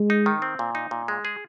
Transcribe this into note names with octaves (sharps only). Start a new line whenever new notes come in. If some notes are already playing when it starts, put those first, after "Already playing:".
Already playing: G#3
D#4
D#3
C4
A#2
D#4
A#2
G#3
G#4